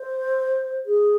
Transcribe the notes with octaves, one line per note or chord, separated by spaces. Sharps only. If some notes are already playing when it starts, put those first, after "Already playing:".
Already playing: C5
G#4